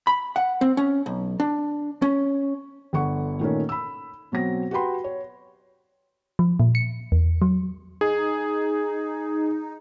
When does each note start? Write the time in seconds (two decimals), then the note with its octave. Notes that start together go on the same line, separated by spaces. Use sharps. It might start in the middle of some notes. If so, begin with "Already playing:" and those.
0.07 B5
0.36 F#5
0.61 C4
0.77 C#4
1.06 B1
1.40 D4
2.02 C#4
2.93 G1 D3 F#5 C#6
3.40 A#2 D#3 A3 C#4
3.69 B5 E6
4.32 B2 F#3 C4 A#6
4.71 F#4 G4 B4 G5 B5 C6
5.04 C#5
6.39 F3
6.60 A#2
6.75 C#7
7.12 E2
7.42 F#3
8.01 D#4 G#4